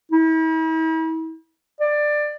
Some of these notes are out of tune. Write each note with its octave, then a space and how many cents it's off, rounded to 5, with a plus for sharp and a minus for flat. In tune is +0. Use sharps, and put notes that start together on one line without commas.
E4 -45
D5 +15